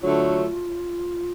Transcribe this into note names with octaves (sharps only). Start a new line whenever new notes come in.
D3 F#3 A3 F4